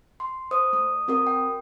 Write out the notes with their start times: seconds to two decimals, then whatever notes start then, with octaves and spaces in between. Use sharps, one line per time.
0.20 C6
0.51 C5 D#6
0.73 A3 D#6
1.08 C4 F#4 A#4 D#6
1.27 G5